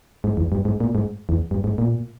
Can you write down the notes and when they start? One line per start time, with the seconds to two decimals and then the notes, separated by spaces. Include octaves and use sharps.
0.24 G#2
0.37 E2
0.52 G2
0.65 G#2
0.80 A#2
0.95 G#2
1.29 E2
1.51 G2
1.64 G#2
1.78 A#2